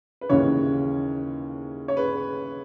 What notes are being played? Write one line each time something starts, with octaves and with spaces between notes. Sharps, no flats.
B4
D#2 C#3 E3 C#5
C#5
B4